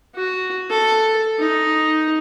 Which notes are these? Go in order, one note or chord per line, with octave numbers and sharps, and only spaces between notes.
F#4
A4
D#4